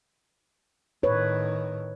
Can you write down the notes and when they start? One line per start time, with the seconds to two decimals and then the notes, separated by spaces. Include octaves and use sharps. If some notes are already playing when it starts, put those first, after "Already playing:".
1.03 A2 D#3 B4 C#5